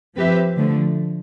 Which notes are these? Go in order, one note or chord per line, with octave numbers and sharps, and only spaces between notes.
F3 C4 G4 B4 E5
D3 F3 A3